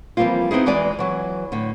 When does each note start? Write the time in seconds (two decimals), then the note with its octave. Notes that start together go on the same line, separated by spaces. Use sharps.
0.17 E3 F3 G3 A#3 C4 F4
0.51 B3 C4 D#4 E4 G#4
0.66 E2 E3 G#3 F#4 D5 G#5
0.99 E3 F#3
1.52 A2 D3